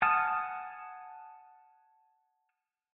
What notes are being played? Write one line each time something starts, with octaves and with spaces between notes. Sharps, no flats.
F#5 G#5 A5 D#6 F6